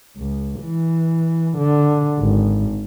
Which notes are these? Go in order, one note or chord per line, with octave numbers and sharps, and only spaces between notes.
C#2
E3
D3
G#1